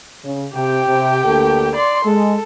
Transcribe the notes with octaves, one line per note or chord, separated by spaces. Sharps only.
C#3
C3 G4 G5
C3
D2 A#3 A4
D5 C6
G#3 A4